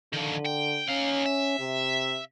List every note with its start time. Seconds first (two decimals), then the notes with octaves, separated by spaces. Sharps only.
0.14 D3 D#3 F3
0.46 G5
0.89 C#4 D#4 F5
1.26 E5
1.60 C3